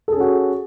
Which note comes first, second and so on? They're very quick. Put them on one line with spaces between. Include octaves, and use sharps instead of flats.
A4 G#4 C#4 F#4